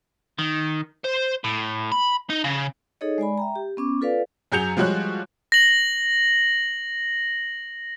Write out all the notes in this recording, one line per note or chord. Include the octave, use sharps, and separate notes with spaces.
D#3
C5
A2
B5
D#4
C#3
D#4 G#4 A4 C#5 D#5
G#3 D5 G#5 B5
E5 G5 A#5
G4
B3 C#4 D6
F4 A4 B4 D5 F5
F#2 F#3 G#4 G6 C#7 F7
F3 G3 G#3 F#4 C#5 F#6
A#6 F#7